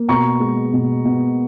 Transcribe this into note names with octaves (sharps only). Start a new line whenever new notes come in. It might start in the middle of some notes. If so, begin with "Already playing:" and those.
Already playing: A#3
B2 A#5 C#6
G#3
B2
B2